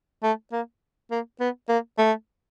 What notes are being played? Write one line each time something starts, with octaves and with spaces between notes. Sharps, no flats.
A3
A#3
A#3
B3
A#3
A3